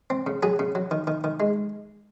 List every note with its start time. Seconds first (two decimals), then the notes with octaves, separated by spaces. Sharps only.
0.10 C4
0.27 C#3
0.43 F#3 G#4
0.59 C#3
0.75 F#3
0.91 D#3
1.07 D#3
1.24 D#3
1.40 G#3